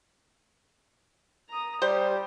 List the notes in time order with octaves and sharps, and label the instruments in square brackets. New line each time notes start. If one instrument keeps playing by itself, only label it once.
[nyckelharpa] A#5 D#6
[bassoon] G3 [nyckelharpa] G4 [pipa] C5